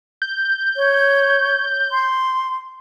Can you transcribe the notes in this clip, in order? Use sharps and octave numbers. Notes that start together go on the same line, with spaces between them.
G6
C#5
C6